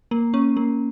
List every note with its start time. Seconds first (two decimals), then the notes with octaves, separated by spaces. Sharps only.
0.11 A#3
0.34 C#4
0.57 A#3